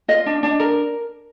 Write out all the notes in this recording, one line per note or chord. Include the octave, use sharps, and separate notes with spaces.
F4 D#5
D4
D4
A#4